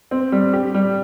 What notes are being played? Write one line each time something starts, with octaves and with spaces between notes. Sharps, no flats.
C4
G3
G4
G3